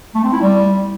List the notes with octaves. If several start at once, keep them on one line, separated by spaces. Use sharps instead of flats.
A3
C4
E4
G3